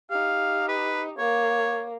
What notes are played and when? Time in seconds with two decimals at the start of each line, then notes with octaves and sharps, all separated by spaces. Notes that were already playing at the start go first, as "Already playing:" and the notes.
0.10 D#4 G4 F5
0.69 B4
1.18 A#3 C#5